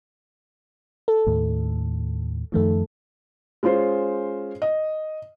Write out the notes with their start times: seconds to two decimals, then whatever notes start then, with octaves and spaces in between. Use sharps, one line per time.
1.08 A4
1.27 D#2 A2
2.52 F#2 D#3 F3 A3 A4
3.63 G#3 C#4 F4 C5
4.62 D#5